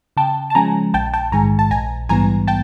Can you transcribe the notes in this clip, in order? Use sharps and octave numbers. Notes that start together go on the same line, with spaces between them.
C#3 G5 A5
A5
F3 G#3 C#4 G#5 A#5
A#1 G5 A5
G5 A5
G#2 D#3 G#3 G#5 A#5
A5
A#1 G#5 A#5
G#2 E3 G3 B3 G#5 A#5
G5 A5